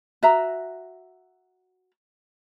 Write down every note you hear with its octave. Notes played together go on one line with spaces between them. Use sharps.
F#4 E5 A#5